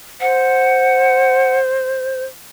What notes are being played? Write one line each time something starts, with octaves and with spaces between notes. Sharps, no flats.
C5 F#5